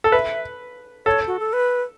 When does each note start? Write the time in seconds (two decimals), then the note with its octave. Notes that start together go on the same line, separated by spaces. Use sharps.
0.04 A4
0.12 B4 E5
1.06 A4 C#5
1.27 F#4
1.40 A4
1.53 B4